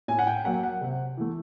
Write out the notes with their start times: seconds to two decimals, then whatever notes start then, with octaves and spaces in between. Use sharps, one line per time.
0.08 A2 G#5
0.19 F#5
0.27 G5
0.45 F#3 A#3 F#5
0.63 F#5
0.81 C3
1.17 E3 A3